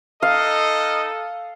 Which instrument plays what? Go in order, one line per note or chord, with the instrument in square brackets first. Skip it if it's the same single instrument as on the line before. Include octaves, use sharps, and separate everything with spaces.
[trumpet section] D#4 D#5 [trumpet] A4 [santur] F5